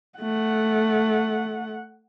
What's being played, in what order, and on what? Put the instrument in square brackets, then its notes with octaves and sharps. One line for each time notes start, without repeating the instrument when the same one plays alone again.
[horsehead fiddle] A3 F#5